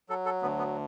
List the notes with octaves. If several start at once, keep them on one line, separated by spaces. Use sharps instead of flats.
F#3 A4
A4
D2 B3
B3